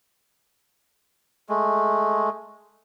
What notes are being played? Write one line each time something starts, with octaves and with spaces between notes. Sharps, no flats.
G#3 A3